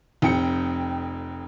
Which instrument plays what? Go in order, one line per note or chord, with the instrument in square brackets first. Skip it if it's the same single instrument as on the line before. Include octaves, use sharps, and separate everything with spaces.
[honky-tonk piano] F1 F2 G5 C#7